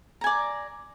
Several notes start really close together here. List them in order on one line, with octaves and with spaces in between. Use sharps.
A#5 G#5 D5